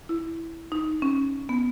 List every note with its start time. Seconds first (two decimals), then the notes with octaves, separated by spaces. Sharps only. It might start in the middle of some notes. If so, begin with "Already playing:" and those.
0.09 E4
0.72 D#4
1.02 C#4
1.49 B3